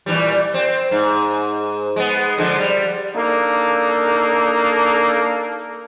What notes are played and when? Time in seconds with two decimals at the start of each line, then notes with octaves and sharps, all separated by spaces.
0.06 A#2 E3 G3
0.54 C4
0.91 G#2
1.96 G#3 B3
2.38 D3 F3 G#3
2.58 G3
3.16 A#3 D4 D#4 A4